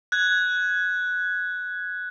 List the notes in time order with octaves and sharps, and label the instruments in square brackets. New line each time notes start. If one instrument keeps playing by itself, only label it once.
[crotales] F#6 G#6